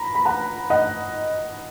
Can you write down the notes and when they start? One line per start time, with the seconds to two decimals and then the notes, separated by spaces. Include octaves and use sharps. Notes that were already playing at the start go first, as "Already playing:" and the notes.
Already playing: A#5 B5
0.15 B5
0.25 F#5 A#5
0.70 D#5 F#5